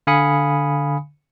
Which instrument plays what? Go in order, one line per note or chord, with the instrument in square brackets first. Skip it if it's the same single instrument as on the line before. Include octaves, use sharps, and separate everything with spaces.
[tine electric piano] D3 F5 G#5 B5 D#6 C#7